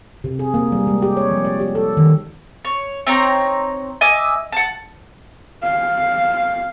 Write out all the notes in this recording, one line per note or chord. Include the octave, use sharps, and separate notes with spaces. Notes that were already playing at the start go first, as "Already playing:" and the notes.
C3
G#4
A#3
G3
G#3
G4
C#5
F3
D5
G4
A4
D#3
C#5
C4 D#4 C#5 A#5
D#5 E5 G#5 D6
F#5 A5
F5